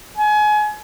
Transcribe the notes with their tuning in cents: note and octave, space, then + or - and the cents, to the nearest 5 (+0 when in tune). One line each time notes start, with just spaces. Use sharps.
G#5 +30